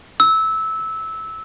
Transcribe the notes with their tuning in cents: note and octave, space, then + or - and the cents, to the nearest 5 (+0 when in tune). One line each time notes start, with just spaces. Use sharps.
E6 -15